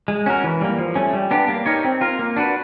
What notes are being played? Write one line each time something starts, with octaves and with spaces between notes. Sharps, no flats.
G#3
C#4 F#4 A#4
E3
G3 A#3
F3
A3 C#4
G3
B3 D4 G4
A#3
D#4 G4 A#4 C#5
C4
F4 A#4
A#3
D4 F#4 B4